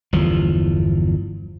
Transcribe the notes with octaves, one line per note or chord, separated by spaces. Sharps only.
G1 E2 F3